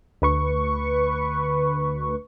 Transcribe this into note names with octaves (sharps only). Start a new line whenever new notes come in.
D2 B4 C#6